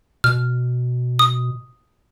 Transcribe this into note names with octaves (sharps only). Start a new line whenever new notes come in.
B2 F6
D#6